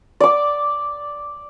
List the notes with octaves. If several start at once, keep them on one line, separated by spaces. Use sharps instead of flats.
D5 D6